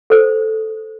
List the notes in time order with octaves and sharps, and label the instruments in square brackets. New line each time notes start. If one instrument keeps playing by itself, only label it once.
[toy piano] A4 C5